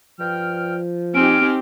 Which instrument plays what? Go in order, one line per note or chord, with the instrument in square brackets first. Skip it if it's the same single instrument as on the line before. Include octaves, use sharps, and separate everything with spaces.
[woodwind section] G2 G5 F6 [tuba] F3
[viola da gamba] C4 D#4 G4 [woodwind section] G#5 F6 [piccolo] D7